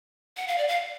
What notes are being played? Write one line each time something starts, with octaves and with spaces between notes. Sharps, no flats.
F#5
F5
D5
F5